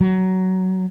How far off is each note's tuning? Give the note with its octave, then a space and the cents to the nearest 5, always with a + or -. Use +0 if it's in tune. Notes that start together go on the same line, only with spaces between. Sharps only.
F#3 +15